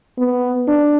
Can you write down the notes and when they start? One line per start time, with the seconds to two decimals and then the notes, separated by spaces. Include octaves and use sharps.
0.18 B3
0.68 D4